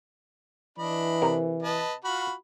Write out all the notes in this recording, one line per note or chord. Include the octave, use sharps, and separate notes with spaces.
E3 D4 D#5 B5
C3 A#4
B4 D#5 A5
F4 F#4 B5